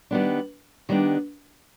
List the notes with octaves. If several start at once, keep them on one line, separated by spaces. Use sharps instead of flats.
D#3 G3 B3 D4
D#3 G3 B3 D4